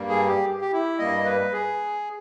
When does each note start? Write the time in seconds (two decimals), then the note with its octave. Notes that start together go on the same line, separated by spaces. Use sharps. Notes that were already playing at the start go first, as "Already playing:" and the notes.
Already playing: G2 G3 A#3
0.09 G#4
0.27 G4
0.61 G4
0.72 E4
0.99 G2 G3 A#3 D#5
1.25 B4
1.52 G#4